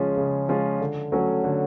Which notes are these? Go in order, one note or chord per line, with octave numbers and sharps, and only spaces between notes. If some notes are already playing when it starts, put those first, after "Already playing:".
Already playing: C#3 F3 G#3 C#4 F4
C#3
F3 G#3 C#4 F4
D3
F#3 A3 C#4
D3